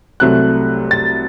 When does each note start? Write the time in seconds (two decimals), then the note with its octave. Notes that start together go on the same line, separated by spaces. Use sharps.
0.20 C2 C3 F#3 A3 F#6
0.91 A6